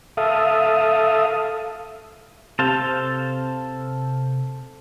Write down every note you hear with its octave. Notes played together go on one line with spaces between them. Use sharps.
A4 E5 F5 D#6
C3 A4 C5 F5